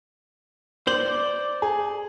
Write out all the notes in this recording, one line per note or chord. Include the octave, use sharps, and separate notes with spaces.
C5 D5 F#7
G#4